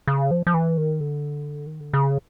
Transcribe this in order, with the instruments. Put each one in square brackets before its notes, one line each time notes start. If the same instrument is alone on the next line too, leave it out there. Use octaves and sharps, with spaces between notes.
[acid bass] C#3
F3
F3
E3
D#3
D3
D#3
D3
C#3